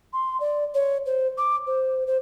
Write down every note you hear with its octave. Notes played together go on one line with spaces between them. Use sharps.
C6
D5
C#5
C5
D6
C5
C5